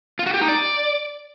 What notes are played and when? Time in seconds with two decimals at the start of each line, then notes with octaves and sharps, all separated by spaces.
0.19 F4
0.26 F#4
0.34 G4
0.41 D#4
0.48 D5